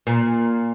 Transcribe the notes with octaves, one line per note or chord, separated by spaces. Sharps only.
A#2